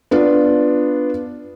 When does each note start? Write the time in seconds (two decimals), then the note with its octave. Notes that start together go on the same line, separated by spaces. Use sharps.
0.11 B3 D4 F4